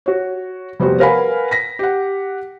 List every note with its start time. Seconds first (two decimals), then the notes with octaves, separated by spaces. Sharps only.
0.06 F#4 C#5
0.80 F1 G3 B3 F#4 C5
1.00 A#4 B4 F5 F#5 G#5 B5
1.51 A#6 B6
1.79 G4 F#5